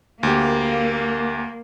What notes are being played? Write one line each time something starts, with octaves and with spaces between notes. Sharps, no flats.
D2 A#3 G4